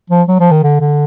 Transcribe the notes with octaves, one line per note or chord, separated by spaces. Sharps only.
F3
F#3
F3
D#3
D3
D3